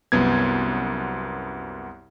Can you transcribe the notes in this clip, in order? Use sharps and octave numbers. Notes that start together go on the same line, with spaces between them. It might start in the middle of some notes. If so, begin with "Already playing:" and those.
C2 F#2 B3 G#6